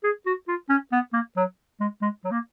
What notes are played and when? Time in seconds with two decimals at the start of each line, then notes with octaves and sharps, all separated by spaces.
0.04 G#4
0.26 F#4
0.48 F4
0.69 C#4
0.92 B3
1.13 A#3
1.36 F#3
1.80 G#3
2.02 G#3
2.25 F#3
2.31 A#3